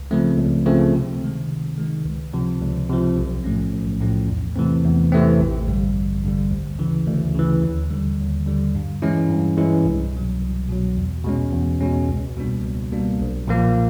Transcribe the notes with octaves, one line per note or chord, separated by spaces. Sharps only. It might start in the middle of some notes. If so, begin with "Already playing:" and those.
Already playing: C#2
C#3 F3 A3 C4
C#2
C#3 F3 A3 C4
C3
D#3 G#3
C3
D#3 G#3
C#2
C3 F3
C#2
C3 F3
B1
A2 F3 A3 C#4
B1
A2 F3 A3 C#4
E2
C3 E3 A3 C4
E2
C3 E3 A3 C4
A1
G2 D3 G3
A1
G2 D3 G3
D2
C#3 E3
D2
C#3 E3
D#2
D3 G3
D#2
D3 G3
G2
E3 G#3 C#4 E4
G2
E3 G#3 C#4 E4
C2
B2 F#3
C2
B2 F#3
E2
B2 G#3 C#4
E2
B2 G#3 C#4
C#2
B2 G3 A#3 D4
C#2
B2 G3 A#3 D4
B1
A#2 F3 A#3